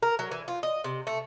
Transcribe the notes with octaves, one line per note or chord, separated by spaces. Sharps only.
A#4
F#3
E3
F4
D#5
C3
A3